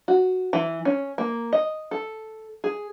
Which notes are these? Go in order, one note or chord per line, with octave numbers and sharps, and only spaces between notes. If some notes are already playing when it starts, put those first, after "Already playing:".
F#4
E3
C#4
A#3
D#5
A4
G#4